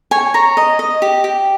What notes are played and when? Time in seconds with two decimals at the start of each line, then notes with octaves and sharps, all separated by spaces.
0.11 C#5 G#5
0.34 C#5 A#5
0.57 D#5
0.79 D#5
1.02 G4
1.24 G4